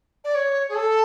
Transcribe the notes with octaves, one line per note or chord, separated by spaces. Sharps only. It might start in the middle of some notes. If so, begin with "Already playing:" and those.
D5
C#5
G#4
A4